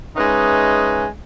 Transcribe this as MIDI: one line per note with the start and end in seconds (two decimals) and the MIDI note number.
0.17 1.06 56
0.17 1.06 61
0.17 1.06 63
0.17 1.06 71
0.17 1.06 76